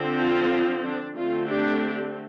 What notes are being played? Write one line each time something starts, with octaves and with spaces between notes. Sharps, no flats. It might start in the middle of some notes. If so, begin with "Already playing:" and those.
Already playing: D3 F3 C4
F4
D4
D3 A3 C4 F4
D4 G4